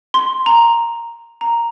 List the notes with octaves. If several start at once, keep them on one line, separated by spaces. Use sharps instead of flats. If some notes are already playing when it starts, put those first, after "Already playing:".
C6
A#5
A#5